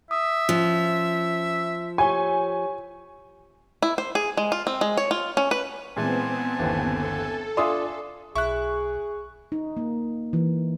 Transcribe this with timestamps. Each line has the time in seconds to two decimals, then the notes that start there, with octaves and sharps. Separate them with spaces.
0.11 E5 D#6
0.49 F3 C#4
1.98 G4 C#5 G#5 C#6
3.82 E4
3.98 C5
4.15 G#4
4.37 G#3
4.52 F4
4.67 C4
4.81 G#3
4.97 C#5
5.11 F4
5.37 C#4
5.51 B4
5.96 A#2 E3 G#3 B3 C4 G#5 A5
6.59 G1 D#2 E3
6.92 A4
7.57 D4 F4 E5 G#5 C6 D#6
8.36 B1 E4 G#4 C#6 F#6
9.52 D#4
9.77 A#3
10.33 E3